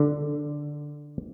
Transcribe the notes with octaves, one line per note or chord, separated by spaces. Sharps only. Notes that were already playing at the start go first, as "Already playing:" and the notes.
Already playing: D3